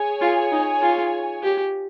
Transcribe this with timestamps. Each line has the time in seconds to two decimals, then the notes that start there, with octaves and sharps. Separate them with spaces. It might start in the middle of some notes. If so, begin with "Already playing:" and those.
Already playing: G#4 C#5 G#5
0.21 F4
0.52 D#4
0.82 F4
1.43 G4